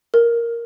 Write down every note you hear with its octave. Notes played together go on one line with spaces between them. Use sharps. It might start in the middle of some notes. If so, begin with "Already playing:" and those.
A#4